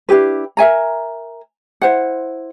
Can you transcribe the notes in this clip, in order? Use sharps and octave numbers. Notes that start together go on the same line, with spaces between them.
D4 E4 G4 B4
A#4 E5 G#5 A#5
E4 C5 F#5